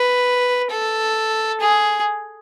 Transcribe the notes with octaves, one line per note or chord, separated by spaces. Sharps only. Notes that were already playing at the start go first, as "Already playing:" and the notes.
Already playing: B4
A4
G#4